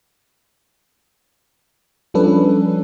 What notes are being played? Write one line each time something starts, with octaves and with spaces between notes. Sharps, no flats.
F3 G3 C#4 D4 A4 B4